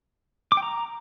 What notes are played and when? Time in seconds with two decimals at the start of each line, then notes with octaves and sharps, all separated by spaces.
0.52 D6
0.57 G5
0.63 A#5